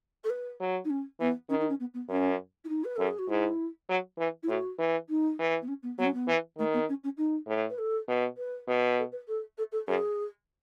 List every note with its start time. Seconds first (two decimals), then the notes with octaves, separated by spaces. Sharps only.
0.24 A4
0.29 B4
0.60 F#3
0.84 D#4
0.90 C#4
1.20 E3 B3
1.49 D#3 C#4
1.60 D#4
1.69 C#4
1.80 B3
1.94 B3
2.09 F#2 C#4
2.64 E4
2.68 D#4
2.84 B4
2.96 F#2 A4
3.07 G#4
3.18 F#4
3.29 G#2 E4
3.89 F#3
4.18 E3
4.43 E4
4.48 A2 F#4
4.78 E3
5.09 D#4
5.39 E3
5.62 B3
5.68 C#4
5.83 B3
5.98 F#3 B3
6.05 C#4
6.13 B3
6.27 E3
6.58 D#3 A3
6.73 B3
6.88 C#4
7.03 C#4
7.17 D#4
7.47 A2
7.69 B4
7.78 A4
8.08 B2
8.37 B4
8.67 B2
8.98 A4
9.12 B4
9.27 A4
9.57 A4
9.71 A4
9.87 F#2 G#4